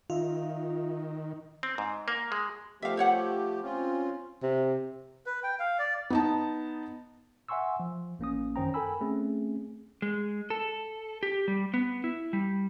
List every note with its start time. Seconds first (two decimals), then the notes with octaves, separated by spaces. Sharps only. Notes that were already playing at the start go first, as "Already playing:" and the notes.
0.10 D#3 F4 E5
1.63 C4
1.78 G#2
2.08 A#3
2.32 G#3
2.82 F3 A3 G4 E5 F5
2.97 C5 C#5 F#5
3.63 C4 C#4 F4
4.43 C3
5.26 B4
5.43 G5
5.59 F5
5.79 D5
6.10 B3 D#4 A5
7.49 E5 F#5 G#5 C6 C#6 E6
7.80 F3
8.19 A1 A#3 C#4 D#6
8.56 F#2 D#3 C#4 C5 G5 A#5
8.74 A4 A#4 G5 G#5 B5 E6
9.01 A3 C4 C#4 G#4
10.02 G#3
10.50 A4
11.23 G4
11.48 G3
11.74 B3
12.04 E4
12.33 G3